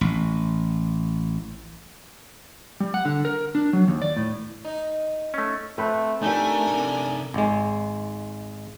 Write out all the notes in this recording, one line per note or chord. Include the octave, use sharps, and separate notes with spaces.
A1
G3
F#5
D3
A#4
D4
F#3
D#2
D5
A2
D#4
A3 C#4
A3 C4 B4
A3 D4 D#4 G4 A#4 G#5
C3 A4
G#1 G#3